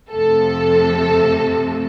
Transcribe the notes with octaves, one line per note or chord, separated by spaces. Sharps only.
F2 C3 F3 A3 A4